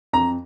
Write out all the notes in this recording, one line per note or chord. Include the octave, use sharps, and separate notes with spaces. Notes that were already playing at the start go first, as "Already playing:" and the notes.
F2 A#5